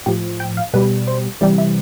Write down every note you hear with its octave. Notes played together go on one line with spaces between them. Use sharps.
A2 F3 G4
G5
F5
B2 G3 B4
C5
C3 E3 G3 D5
E5